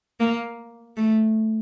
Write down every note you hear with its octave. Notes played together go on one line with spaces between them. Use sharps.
A#3
A3